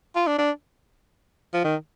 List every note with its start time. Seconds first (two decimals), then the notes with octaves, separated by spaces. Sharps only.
0.16 F4
0.27 D4
0.38 D4
1.54 F3
1.64 D#3